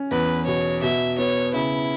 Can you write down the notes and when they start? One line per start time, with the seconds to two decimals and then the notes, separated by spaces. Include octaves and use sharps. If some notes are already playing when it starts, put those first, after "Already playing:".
Already playing: C#4
0.11 E2 B4
0.46 B2 C#5
0.82 B2 E5
1.18 B3 C#5
1.54 C#3 E4